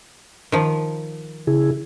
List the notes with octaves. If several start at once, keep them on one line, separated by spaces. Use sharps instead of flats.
D#3 F3
C#3 E4 G#4